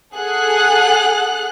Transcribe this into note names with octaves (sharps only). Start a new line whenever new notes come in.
G#4 A4 F#5 F#6